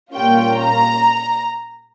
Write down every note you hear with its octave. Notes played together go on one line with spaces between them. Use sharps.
A#2 G3 A#3 C#4 F4 G5
A#5